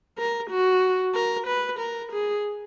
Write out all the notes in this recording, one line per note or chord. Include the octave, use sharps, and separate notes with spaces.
A#4
F#4
A#4
B4
A#4
G#4